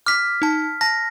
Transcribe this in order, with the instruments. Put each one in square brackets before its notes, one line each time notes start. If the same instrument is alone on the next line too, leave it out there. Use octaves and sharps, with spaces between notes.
[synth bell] D6 [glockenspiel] F6 B6
[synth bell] D#4 A5
[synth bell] A5 [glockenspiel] A#6